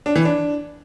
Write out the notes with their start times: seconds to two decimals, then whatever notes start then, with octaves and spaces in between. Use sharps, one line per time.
0.06 D4
0.16 E3
0.25 D4